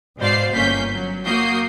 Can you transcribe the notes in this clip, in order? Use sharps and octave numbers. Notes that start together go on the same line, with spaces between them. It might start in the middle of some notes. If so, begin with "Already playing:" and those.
G#2 B2 C5 D5 F5 C7
G1 A#3 C#4 G6 B6
F#3
A#3 F#4 D#6 G6 C7